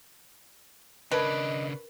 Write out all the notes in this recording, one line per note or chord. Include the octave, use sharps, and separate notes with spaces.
C#3 D4 A#4 B4 D#5 A5 G#6